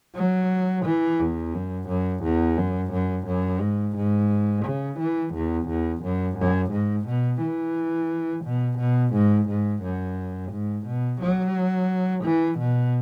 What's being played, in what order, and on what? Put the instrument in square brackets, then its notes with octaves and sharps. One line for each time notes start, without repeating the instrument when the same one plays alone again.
[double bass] F#3
E3
E2
F#2
F#2
E2
F#2
F#2
F#2
G#2
G#2
C#3
E3
E2
E2
F#2
F#2
G#2
B2
E3
B2
B2
G#2
G#2
F#2
G#2
B2
F#3
E3
B2